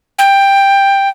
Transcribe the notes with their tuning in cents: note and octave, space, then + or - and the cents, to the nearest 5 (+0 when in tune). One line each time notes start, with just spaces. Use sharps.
G5 +10